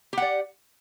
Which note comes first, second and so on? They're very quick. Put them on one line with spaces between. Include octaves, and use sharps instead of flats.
G4 F#5 D5